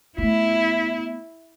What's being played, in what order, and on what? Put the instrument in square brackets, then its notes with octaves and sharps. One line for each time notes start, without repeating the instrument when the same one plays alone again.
[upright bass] A3 B3 [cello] E4